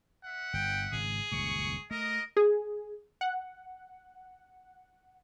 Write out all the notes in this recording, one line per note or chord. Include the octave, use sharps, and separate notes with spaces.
E5 F#5
G1 G5
G#1 G#2 C#3 G#4
D#1 C#2 F#2 C#6
A3 A#4 D#5
G#4
F#5